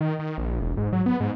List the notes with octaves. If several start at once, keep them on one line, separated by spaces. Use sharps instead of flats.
D#3
D#3
A#1
E1
G#2
F#3
B3
G#2